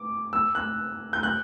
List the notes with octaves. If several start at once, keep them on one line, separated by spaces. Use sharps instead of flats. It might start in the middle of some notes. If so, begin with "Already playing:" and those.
Already playing: D6
E6
F#6
G6
F#6